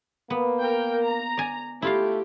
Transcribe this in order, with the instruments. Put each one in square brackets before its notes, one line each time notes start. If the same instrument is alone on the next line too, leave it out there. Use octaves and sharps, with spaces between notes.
[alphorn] A#3 [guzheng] B3
[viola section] A#4 G5
A#5
[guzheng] D5 G#5
[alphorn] A3 [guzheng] E4 F4 F5 [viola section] G4